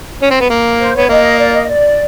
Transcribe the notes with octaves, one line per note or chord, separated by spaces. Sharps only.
C#4
C4
B3
A#3
C5
B3 C#5
A#3 D#5
D5
D#5
D5